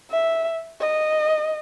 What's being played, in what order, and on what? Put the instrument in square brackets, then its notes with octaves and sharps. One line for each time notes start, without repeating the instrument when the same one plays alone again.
[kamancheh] E5
D#5